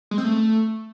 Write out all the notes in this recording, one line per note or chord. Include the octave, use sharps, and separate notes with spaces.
G#3
C4
A3